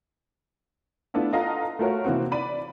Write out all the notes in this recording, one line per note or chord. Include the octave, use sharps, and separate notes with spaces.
A3 B3 D4 E4 F4
F4 A4 D#5 F5 F#5 A#5
A3 F4 F#4 A#4 C#5
C3 E3 A#3 C4 F#4
D5 B5 D#7